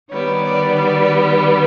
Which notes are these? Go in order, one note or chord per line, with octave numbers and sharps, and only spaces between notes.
D#3 G3 B3 C#5
D5
D5